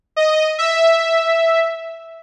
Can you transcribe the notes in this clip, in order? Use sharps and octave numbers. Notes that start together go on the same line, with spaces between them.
D#5
E5